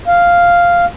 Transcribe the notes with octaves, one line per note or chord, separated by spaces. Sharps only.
F5